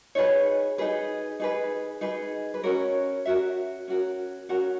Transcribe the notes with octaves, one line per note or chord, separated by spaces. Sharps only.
D#4 G#4 B4 C#5
D#4 G#4 B4
D#4 G#4 B4
D#4 G#4 B4
B4
C#4 F#4 A#4 C#5
C#4 F#4 A#4 E5
C#4 F#4 A#4
C#4 F#4 A#4 F#5